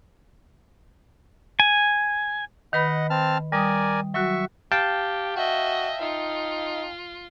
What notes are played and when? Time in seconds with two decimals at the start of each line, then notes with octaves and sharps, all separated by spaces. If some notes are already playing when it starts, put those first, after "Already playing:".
1.60 G#5
2.73 D#3 B4 D#5 F#5 B5
3.10 C4 A5 F6
3.52 G3 A#4 D5 G#5 D#6
4.14 F#3 F#4 E5 C#6
4.72 G4 F5 G5 A5
5.36 F#4 D#5 E5
6.01 D#4 F4